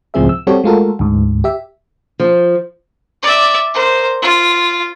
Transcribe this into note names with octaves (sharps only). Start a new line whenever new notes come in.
C#2 A2 F3 C4 G#4 E5
E6
G3 C4 F#4 G4 A4 C#5
G#3 A3 F4 F#4 A4 A#4
D2 G#2
G4 E5
F3
D5 E5
A#4 C5
F4